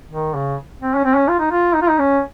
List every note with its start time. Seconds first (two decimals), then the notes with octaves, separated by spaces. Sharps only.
0.11 D#3
0.35 C#3
0.82 C4
0.96 C#4
1.05 C4
1.16 C#4
1.29 F4
1.39 D#4
1.51 F4
1.75 D#4
1.82 F4
1.90 D#4
1.99 C#4